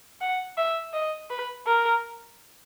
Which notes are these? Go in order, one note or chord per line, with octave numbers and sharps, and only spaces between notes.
F#5
E5
D#5
B4
A#4